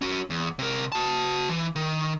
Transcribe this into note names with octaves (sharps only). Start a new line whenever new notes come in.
C#4 F#4
E2
C3 A#4
F#4 A5
E3
D#3